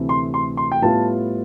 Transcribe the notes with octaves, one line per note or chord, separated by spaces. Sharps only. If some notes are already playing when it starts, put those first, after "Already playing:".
Already playing: D2 C3 E3 A3 C4
C6
C6
C6
G5
A2 G3 B3 F4 A5